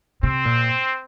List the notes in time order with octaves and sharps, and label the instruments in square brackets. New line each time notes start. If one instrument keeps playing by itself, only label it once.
[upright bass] C3 [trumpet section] C4
[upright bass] A#2